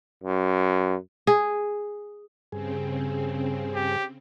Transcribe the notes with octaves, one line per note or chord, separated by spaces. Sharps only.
F#2
G#4
G2 C#3 C4 G#4
G4